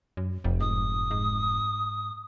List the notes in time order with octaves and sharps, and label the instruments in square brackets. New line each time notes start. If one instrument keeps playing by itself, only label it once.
[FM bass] F#2
[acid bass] F1 [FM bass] F2
[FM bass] G#2 [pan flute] D#6
[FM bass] G#2